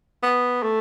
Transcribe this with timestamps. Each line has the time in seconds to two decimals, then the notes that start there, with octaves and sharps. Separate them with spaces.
0.23 B3
0.63 A3